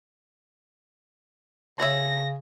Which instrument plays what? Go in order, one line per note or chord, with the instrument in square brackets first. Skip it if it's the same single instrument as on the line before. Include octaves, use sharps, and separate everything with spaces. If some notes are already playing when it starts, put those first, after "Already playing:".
[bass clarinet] C#3 [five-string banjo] G#4 C#5 E5 [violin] A#6